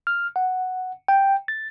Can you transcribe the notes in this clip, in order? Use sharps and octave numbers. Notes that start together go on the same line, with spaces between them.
F6
F#5
G5
A6